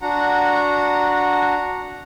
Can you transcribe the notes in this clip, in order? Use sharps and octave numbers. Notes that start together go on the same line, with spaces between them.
D4 F#4 F#5 A#5